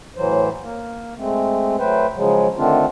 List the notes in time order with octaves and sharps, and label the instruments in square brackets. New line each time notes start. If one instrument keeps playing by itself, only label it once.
[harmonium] A2 E3 F#3 C5
A#3
G#3 A3 C4
F#3 A3 B4 C5 G5
C#3 F3 F#3 G#3
D3 D#3 A3 C4 D4 F4